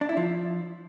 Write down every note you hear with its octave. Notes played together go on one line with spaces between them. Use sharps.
D4
E4
F3